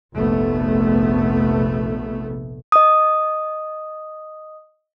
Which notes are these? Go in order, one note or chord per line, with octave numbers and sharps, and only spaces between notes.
F1 A#1 A3 B3
D#5 D#6